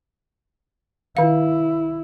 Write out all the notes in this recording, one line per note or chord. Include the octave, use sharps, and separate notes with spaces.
D#3 E4 F5